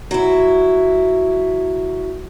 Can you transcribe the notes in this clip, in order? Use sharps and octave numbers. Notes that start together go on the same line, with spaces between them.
F#3 E4